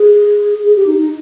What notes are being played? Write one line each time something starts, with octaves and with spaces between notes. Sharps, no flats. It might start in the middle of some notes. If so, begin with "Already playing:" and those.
Already playing: G#4
G#4
G4
D#4
D#4